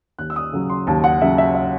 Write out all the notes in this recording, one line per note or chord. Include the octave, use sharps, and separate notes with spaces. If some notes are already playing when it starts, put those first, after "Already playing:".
D#2 F#6
E6
D#6
C#3 F#3
C6
D#2 A5
F#5
C#3 F#3 E5
E5
E5